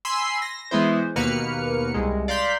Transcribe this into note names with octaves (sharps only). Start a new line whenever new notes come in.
G#5 B5 C6 E6 C7
A#6
E3 G#3 B3 E4 C5
D#2 B2 A#3 B4 F6 C#7
C2 G#3
D5 F5 A#5 C6 G6 B6